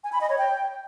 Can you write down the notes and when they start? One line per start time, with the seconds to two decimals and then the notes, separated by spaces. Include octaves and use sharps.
0.04 G#5
0.12 B5
0.21 D#5
0.29 C#5
0.38 G5